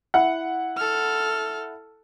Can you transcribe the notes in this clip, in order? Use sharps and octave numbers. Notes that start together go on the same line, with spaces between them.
E4 F#5
A4 F6